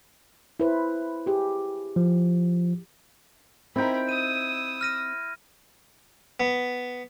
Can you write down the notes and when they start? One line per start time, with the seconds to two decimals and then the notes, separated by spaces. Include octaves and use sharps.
0.60 E4 B4 C5
1.26 G4 G#4
1.96 F3
3.76 C4 D#4 E4 A#4 G5 B5
4.09 D#6 E6 D#7
4.81 F6 A#6 D#7
6.40 B3